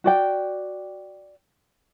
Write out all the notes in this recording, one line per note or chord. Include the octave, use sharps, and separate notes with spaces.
F#4 D5 G5